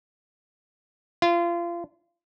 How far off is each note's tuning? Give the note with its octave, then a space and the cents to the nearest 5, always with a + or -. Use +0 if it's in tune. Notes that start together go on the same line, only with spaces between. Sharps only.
F4 -30